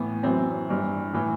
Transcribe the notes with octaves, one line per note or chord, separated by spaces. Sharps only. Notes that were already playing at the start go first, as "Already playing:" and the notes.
Already playing: A2 E3 B3
F#2 E3 C4
G2 E3
A2 E3